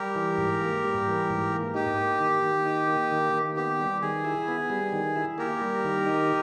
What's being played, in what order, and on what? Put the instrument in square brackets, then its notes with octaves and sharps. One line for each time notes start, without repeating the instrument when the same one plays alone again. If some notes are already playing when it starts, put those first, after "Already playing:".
Already playing: [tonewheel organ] G3 [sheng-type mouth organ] G4 A#4
[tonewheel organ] E3
G#2
A#3
G3
E3
G#2
A#3
[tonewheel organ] D#4 [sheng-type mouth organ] G4
[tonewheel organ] A#3
D#3
D#3
D#4
A#3
D#3
D#3
[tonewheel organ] B3 [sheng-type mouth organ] G4
[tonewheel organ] G3
[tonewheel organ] D#3 [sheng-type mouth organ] G#4
[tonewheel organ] E4
B3
G3
D#3
E4
[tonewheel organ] A#3 [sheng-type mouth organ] G4 A#4
[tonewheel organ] G3
D#3
D#4